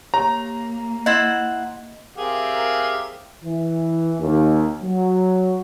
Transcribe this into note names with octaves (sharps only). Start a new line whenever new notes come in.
A#3 G4 C#5 A#5
E4 C5 D#5 E5 F#5
C4 G4 G#4 A#4 E5 F5
E3
D#2
F#3